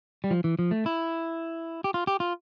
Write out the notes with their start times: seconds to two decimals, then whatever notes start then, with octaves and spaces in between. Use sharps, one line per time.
0.24 G3
0.31 F3
0.44 E3
0.59 F3
0.71 A3
0.86 E4
1.84 G4
1.94 F4
2.07 G4
2.20 F4